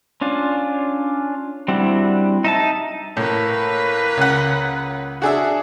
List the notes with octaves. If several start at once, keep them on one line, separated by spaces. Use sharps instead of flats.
C#4 D4 F4
G3 C4 D4 E4 F#4
D#4 E5 A5
A2 A#3 B4
C#2 F#5
D4 F#4 G#4 E5